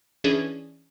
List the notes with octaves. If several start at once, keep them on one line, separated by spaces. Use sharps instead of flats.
E3 C#4 D4 G#4